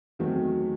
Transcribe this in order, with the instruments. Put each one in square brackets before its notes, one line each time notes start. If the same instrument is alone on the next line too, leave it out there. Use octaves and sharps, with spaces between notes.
[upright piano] E2 D#3 F#3 A3 C4